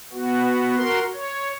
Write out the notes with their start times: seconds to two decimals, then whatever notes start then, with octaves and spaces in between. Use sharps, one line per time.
0.13 B3 F#4
0.77 F#4 A#4 C6
1.14 C#5